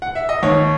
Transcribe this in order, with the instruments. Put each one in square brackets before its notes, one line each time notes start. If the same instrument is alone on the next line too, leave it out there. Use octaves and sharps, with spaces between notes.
[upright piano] F#5
E5
D#5
D#2 C#5